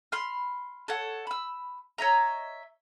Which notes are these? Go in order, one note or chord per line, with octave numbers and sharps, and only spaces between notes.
B5 C6 F6
A4 C#5 F#5
B5 E6
C#5 D#5 E5 A#5